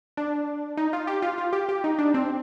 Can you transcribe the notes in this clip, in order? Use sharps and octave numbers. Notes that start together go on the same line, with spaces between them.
D4
D#4
F4
G4
F4
F4
G4
G4
D#4
D4
C4